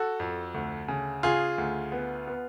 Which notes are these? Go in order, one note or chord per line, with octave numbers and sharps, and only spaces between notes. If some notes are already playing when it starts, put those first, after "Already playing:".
Already playing: F#4 A4
F2
D2
C#3
C#3 F4 G#4
D2
B3
B3